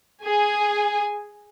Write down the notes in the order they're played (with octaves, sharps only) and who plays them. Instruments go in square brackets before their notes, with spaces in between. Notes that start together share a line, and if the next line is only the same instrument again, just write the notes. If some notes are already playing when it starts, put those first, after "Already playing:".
[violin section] G#4 G#5